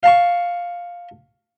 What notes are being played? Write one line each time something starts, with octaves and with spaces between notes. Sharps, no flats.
F5 A5 C#6